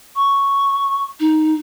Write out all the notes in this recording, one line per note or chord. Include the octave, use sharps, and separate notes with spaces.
C#6
D#4